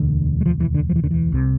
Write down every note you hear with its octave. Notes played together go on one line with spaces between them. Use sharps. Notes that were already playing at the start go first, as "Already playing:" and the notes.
Already playing: E1 D2 D3
G#3
F3
E3
D3
F3
E3
D3
E3
C2 C3